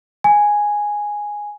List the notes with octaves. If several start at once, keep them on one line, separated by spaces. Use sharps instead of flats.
G#5